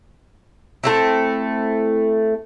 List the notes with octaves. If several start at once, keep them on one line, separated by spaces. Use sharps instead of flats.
A3 C4 E4